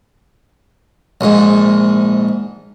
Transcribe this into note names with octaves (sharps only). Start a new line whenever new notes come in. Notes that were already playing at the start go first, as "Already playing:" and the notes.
A#1 G#2